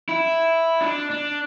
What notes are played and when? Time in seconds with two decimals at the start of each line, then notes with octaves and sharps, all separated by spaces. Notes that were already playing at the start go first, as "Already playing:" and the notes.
0.09 E4
0.81 D4
1.11 D4